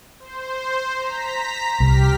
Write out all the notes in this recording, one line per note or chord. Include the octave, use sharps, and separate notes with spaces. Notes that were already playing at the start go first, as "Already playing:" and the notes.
C5
A#5 B6
C2 G4 F6 B6